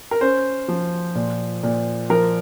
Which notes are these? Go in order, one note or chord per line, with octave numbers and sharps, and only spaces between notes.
A#4
C#4 C5
F3
A#2
A#2
F3 A#4